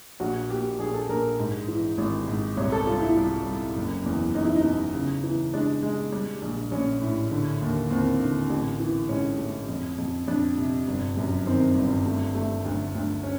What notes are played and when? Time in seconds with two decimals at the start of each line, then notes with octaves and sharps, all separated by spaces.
0.20 A#1 F#4
0.50 A#2 G4
0.79 A#1 G#4
0.94 A4
1.09 A#1 A#4
1.39 G#2
1.68 E3
1.98 G#1
2.27 G#2
2.57 C2 C#5
2.72 A4
2.87 G3 F4
3.02 E4
3.17 C2
3.46 G3
3.76 F#1
4.06 E2
4.35 E2 D#4
4.45 E4
4.55 D#4
4.64 B2
4.94 C#3
5.23 E3
5.53 G#3 D4
5.83 G#3
6.12 G3
6.42 A#1
6.71 A#1 C#4
7.02 A2
7.32 D3
7.61 D#2
7.91 D#2 C4
8.20 D3
8.50 A1
8.80 E3
9.09 G#2 C#4
9.38 A3
9.69 F2
9.98 F2
10.28 F2 D4
10.57 C3
10.88 G1
11.17 F#2
11.46 D#3 C4
11.75 G1
12.05 A3
12.35 A3
12.65 D2
12.95 D2
13.23 C#4